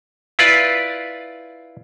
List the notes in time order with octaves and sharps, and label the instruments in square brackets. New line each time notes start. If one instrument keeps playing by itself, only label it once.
[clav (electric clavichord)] E4 F4 B4 D5